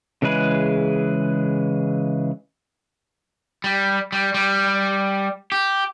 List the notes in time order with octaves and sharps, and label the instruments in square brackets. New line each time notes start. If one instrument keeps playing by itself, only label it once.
[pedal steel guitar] C#3 E3 G#3 G#4 B4
[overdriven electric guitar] G3
G3
G3
G4